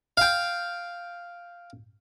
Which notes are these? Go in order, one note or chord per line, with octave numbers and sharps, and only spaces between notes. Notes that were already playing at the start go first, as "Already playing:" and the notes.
F5 G5